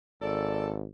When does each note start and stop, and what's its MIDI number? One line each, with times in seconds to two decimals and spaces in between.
0.21 0.86 32
0.21 0.69 69
0.21 0.69 74